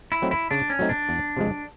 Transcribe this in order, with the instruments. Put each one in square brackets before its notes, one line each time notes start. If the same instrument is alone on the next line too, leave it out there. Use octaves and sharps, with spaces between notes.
[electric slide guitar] E4
[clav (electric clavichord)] F#3 A3 C4 D#4
[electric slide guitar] E4
[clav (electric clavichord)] C#3 [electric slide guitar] D4
[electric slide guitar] C#4
[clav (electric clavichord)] F#3 A3 C4 D#4
[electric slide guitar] D4
[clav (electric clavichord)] E2
C3 F3 G#3